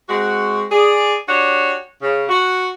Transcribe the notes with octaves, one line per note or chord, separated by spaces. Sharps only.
G#3 C4 F#4
G#4 D5
D4 F#4 G4 C#5
C#3
F#4